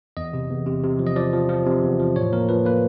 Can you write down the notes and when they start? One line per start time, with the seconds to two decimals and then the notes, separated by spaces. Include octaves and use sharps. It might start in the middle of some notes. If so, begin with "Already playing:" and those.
0.17 E2 D#5
0.33 C3
0.50 E2
0.67 C3
0.84 C3
0.99 F3
1.07 D#5
1.16 F3 D5
1.33 F3
1.49 F3
1.66 C3
1.82 E2
1.99 F3
2.16 A2 C#5
2.33 A#3 A#4
2.49 F3 B4
2.65 A#3 B4